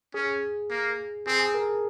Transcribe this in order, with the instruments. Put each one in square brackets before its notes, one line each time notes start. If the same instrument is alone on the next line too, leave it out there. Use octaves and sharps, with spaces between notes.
[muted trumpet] C#4 [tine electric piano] G#4
[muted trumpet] A#3
[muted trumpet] C4 [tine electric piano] G#4
[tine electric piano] G#4
A#4